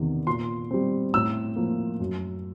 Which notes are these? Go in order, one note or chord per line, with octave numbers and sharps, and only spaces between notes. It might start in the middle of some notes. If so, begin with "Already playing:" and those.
Already playing: E2 C3 D#3
A#2 C6
G3 C4
A2 E6
F3 A#3
F#2